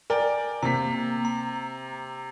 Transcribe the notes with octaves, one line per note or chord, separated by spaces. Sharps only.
A#4 D5 G5 G#5
C3 A#3 A#5 B6
A#5